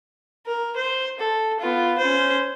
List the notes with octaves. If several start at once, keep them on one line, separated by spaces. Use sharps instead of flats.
A#4
C5
A4
B3 F4
C#4 C5